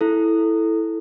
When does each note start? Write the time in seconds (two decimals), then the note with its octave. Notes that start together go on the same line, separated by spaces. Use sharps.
0.01 E4 A4